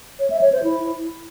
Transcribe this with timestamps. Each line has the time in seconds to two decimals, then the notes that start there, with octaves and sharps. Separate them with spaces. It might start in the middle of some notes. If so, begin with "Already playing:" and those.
0.19 C#5
0.30 E5
0.41 C#5
0.52 C5
0.63 E4